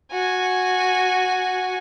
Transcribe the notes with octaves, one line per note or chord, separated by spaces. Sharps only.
F#4 G#5